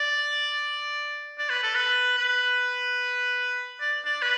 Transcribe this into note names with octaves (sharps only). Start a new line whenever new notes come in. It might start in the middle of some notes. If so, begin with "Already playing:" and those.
Already playing: D5
D5
B4
A4
B4
B4
D5
D5
B4